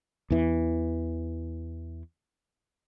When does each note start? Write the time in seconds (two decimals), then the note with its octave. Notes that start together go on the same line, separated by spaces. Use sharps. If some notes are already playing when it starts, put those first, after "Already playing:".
0.30 E2 E3